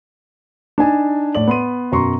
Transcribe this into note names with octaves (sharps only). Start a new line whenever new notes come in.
D4 D#4 G#5 A5
A2 D5 F#7
B3 C6 D#7
F#2 B2 A#5 C6 C#6